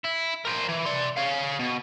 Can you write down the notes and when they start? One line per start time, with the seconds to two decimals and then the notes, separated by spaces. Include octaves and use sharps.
0.04 E4
0.45 A#4 C5
0.69 E3
0.85 D5 C6
1.16 C#5 F5
1.59 B2